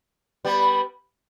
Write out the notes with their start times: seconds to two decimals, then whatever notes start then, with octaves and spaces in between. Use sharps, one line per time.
0.45 G3 B3